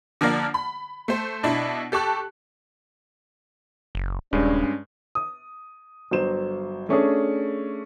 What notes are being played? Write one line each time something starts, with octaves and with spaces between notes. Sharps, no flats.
D3 F3 A#3 A#4 D5
B5
A3 C5
B2 D4 E4
G4 A4 A5 C#6 F#6
F#1
D#1 G2 G#3 C#4 D4
D#6
G1 F#3 C5 E7
A3 C#4 D4 G#4